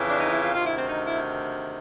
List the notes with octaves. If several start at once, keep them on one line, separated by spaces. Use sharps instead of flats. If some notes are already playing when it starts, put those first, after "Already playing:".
Already playing: F2 C#3 E3
D4
D#4
E4
F4
D2 C3 D#3 F4
E4
C4
D#4
E4